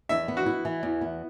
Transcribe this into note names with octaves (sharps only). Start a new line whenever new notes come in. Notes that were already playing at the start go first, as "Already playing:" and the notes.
E2 E5
B3
F#4
E4
E3
E2
B3